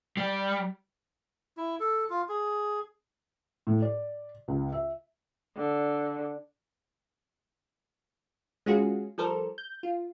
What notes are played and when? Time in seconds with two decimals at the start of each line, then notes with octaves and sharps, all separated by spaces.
0.17 G3
1.57 E4
1.80 A4
2.10 F4
2.29 G#4
3.67 A2
3.82 D5
4.48 C#2
4.72 E5
5.57 D3
8.66 G#3 C#4 F4 F#4 G#4
9.18 F3 G3 A4 A#4 C5
9.58 G6
9.83 F4